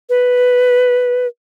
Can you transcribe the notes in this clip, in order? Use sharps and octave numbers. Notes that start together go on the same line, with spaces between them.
B4